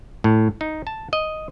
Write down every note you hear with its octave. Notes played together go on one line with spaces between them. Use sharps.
A2
D#4
A5
D#5